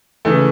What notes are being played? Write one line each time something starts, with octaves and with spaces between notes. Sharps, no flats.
C#3 E3 A3